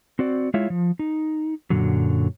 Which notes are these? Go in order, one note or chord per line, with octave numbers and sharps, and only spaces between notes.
C4 F#4 D5
G#3 E4 F4 C#5 E5 F5
F3
D#4
F#2 A#2 D3 F#3